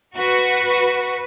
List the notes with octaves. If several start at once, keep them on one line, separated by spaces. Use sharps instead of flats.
F#4 B4